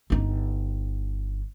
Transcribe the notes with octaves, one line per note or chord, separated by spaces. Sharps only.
G1 D#4